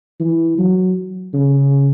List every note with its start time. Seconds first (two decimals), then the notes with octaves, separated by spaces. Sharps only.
0.20 E3
0.58 F#3
1.34 C#3